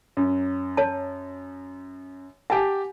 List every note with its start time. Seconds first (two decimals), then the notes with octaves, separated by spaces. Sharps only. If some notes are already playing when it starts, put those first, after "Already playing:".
0.17 F#2
0.77 C#5 A5
2.50 G4 F#5 G#5 A5